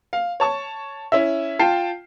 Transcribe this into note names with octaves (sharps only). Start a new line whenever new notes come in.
F5
C#5 A5 C#6
C#4 E4 E5
F4 G5 A5 C7